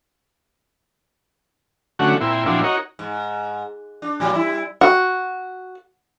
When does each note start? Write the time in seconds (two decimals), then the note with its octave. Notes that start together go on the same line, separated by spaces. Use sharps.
1.99 D3 F#3 A3 C#4 F#4
2.21 A#2 C4 E4
2.46 A#2 F3 F#3 C4 D4 E4
2.64 D#4 F#4 A#4 C#5
2.99 G#2
4.02 D4
4.20 A2 F#3 G3
4.34 G3 E4
4.81 F#4